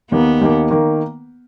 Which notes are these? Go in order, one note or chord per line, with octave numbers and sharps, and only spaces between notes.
D#2 D#3 A#3 B3
D#2 D#3 A#3
D#3 A#3